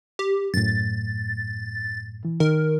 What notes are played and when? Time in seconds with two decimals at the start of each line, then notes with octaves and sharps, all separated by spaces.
0.19 G4
0.54 F#2 A2 A6
2.25 E3
2.40 D#3 A#4